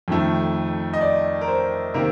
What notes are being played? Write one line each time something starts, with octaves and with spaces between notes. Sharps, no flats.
F2 D#3 A3
D#5
D5
A#4
C5
C3 D#3 A#3 A#4